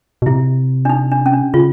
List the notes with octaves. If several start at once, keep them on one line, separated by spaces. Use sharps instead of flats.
B2
C3 E4
D4
D#4
D4
C#4
D4
C#3 F4